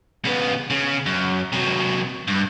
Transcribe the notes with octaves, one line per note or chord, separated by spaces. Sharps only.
C#3 B3
C#3
F#2
C3 F#3
G2